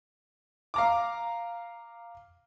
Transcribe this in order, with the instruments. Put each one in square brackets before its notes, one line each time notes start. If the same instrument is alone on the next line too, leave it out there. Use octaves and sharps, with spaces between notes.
[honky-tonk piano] F5 A#5 D6